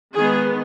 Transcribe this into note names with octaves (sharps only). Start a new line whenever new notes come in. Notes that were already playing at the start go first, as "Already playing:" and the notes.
D#3 G#3 B3 G#4